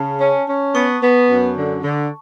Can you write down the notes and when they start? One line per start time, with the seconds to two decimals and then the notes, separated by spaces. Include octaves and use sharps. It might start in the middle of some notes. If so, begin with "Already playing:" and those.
Already playing: C#3 A5
0.20 C#4
0.48 C#4
0.75 B3 C#6
1.02 B3
1.30 F#2
1.57 D3
1.83 D3